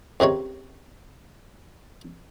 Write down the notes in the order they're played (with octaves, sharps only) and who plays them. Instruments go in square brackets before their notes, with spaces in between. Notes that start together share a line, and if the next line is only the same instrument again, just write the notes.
[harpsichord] C#2 C3 D#3 C#5